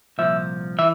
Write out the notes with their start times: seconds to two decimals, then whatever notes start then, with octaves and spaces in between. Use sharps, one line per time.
0.18 C2 A#2 F3 E5
0.79 E3 E5